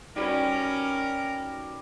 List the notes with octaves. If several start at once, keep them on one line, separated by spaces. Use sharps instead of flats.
G3 C#4 D#4 F#4 A#4 B4